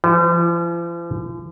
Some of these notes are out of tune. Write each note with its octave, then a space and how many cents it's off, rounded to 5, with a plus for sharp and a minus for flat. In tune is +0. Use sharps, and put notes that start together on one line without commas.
F3 -45